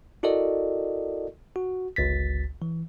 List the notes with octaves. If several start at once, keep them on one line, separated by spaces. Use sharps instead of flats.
E4 F#4 A4 A#4 D5 D#5
F#4
G1 C#2 A6 B6
E3